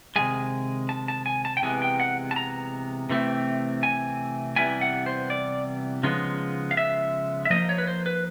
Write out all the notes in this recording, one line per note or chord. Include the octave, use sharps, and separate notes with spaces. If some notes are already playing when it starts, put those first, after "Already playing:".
C3 D#3 G#3 G#5
A5
A5
G#5
A5
G5
C3 E3 G#3 B3 G#5
G5
F#5
A5
A#5
C3 E3 A3 C4
G#5
C3 E3 G3 B3 E4 G#5
F#5
C5
D5
C#3 F3 G#3 B3 D#4
F5
E5
E5
F3 A#3 D#4 D#5
C#5
B4
C5
B4